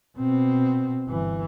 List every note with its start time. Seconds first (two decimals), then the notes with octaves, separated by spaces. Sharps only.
0.18 B2 C4
1.07 G1 E3